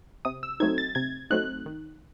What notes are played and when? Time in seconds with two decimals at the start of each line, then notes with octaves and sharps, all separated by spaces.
0.25 C3 D#6
0.43 E6
0.60 F#3 A3 C4 D#4 G#6
0.78 A6
0.95 C3 G#6
1.31 F#3 A3 C4 D#4 F#6
1.66 D#3